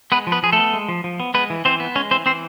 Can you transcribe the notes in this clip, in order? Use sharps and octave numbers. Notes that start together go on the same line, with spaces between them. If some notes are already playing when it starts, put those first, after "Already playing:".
G#3 B3 B4
F3
B3 B4
F3 G#4
A3 A4
B3
G#3
F3
F3
B3
G#3 B3 B4
E3
E3 C4 C5
B3
G#3 C#4 C#5
E3 C4 C5
E3 C4 C5